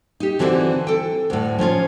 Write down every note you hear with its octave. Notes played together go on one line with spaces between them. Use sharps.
D#4 G4
D3 E3 C4 F#4 C5
A4 G5
D2 A2
F3 C#4 F4 C#5